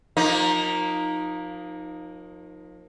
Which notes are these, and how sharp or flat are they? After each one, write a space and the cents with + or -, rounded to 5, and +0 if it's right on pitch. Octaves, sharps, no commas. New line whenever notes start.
F3 +35 A#3 +0 D#4 +0